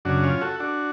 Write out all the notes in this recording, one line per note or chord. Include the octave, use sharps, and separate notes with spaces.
F#2 C#3 D4 F#4
C#4 F4
F#4 A4
D4 F#4